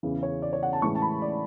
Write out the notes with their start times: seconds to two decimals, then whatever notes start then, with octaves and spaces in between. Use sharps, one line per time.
0.03 E2 C#3 E3
0.23 C#5
0.42 D5
0.53 C#5
0.63 F#5
0.73 A5
0.82 A2 E3 G#3 C#4 C#6
0.95 A5
1.02 B5
1.22 D5